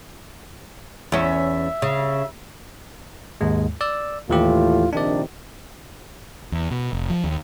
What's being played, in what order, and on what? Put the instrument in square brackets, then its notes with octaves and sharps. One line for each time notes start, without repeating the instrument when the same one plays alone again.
[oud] E2 C#4 [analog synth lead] E5
[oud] C#3
[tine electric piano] D#2 G#2 G#3
D5 E6
[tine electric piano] D#2 E3 G4 [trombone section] A2 F4
[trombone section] A#1 C3 D#3 [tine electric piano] D4 D5
[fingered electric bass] E2
B2
F1
F3
D#2